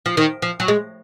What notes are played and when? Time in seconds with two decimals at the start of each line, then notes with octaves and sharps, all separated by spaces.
0.06 F3
0.17 D#3
0.42 F3
0.60 F#3
0.68 G#3